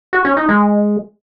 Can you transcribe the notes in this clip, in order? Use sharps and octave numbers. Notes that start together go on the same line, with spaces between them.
F#4
C#4
D#4
G#3